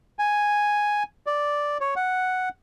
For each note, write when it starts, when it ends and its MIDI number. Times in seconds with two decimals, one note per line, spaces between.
0.19 1.03 80
1.27 1.78 74
1.81 1.94 73
1.96 2.49 78